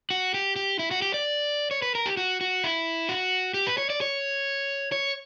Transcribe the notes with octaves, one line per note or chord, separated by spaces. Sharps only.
F#4
G4
G4
E4
F#4
G4
D5
C#5
B4
A#4
G4
F#4
F#4
E4
F#4
G4
B4
C#5
D5
C#5
C#5